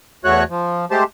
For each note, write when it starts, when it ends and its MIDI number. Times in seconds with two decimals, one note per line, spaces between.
0.24 0.44 40
0.24 0.44 57
0.24 0.44 66
0.24 0.44 73
0.24 0.44 90
0.50 0.85 53
0.91 1.04 56
0.91 1.04 57
0.91 1.04 67
0.91 1.04 72
0.91 1.04 81